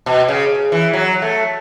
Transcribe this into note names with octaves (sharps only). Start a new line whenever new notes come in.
B2
C#3
E3
F#3
A3